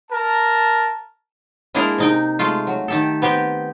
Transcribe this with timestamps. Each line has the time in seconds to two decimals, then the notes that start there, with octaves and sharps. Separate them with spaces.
0.11 A#4 A5
1.75 G#3 A#3 D4 E4 G#4 A#4
1.98 C3 D#4 G5
2.39 G#3 A3 F4
2.67 F#3
2.88 D#3 G4 A4
3.22 B3 C4 G4